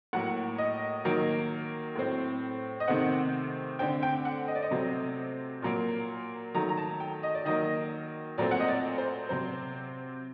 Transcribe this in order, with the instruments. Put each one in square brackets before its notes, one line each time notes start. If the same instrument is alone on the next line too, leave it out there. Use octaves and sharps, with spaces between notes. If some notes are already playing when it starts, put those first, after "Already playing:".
[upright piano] A2 F#3 A#3 F#5
D#5
D#3 F#3 A#3
A2 A3 C4
D#5
C3 D#3 A3 C4 F#5
D3 A3 C4 G5
G5
F#5
D#5
D5
D#5
C3 F#3 A3 C4
A#2 F#3 A#3
D#3 F#3 A3 A#5
A#5
A5
G5
D#5
D5
D#3 F#3 A#3 D#5
A#2 F#3 A3 C4 D5
F#5
D#5
D5
C5
C3 F#3 C4 C5